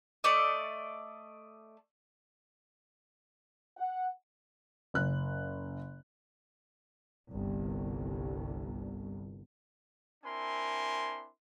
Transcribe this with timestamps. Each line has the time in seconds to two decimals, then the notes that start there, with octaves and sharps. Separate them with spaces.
0.24 A3 D5 D#5
3.77 F#5
4.94 F#1 F#6
7.30 G1 C2
10.24 C4 D4 E4 A#4 G#5 C6